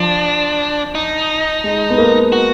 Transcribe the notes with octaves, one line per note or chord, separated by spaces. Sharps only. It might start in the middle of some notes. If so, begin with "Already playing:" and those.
Already playing: F3 D4
D#4
G#3
B3
A#3
F#4